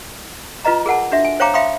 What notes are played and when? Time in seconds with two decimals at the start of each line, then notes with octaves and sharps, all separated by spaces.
0.64 F4 B4 D#5 A#5
0.86 G#4 A#4 F#5 A5
1.12 D4 F#4 E5
1.24 G#5
1.40 C5 C#5 F5 G5 A#5 D6
1.54 E5 F5 G5 B5 C6 D#6